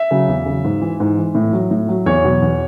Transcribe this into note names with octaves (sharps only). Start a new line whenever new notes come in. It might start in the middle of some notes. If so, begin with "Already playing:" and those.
Already playing: E5
C#3 F#3
E2
C#3 F#3
G#2
E3
G#2
E3
A2
F#3
A2
F#3
E2 C#5
B2 F#3
E2